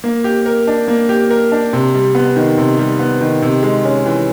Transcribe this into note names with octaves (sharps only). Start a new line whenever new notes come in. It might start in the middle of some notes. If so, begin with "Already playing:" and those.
A#3
G4
A#4
D4
A#3
G4
A#4
D4
C3
G3
B3
D#3
C3
G3
B3
D#3
C3
G#3
C#4
E3